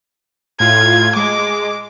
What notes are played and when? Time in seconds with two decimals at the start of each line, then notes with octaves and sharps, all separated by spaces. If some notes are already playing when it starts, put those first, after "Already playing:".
0.60 A2 F4 G#6
1.16 G#3 D6